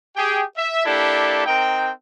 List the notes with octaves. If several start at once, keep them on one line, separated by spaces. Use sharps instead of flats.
G4 G#4 G5
E5
A#3 D4 E4 G4 A4 D5
C4 D#4 A#4 G5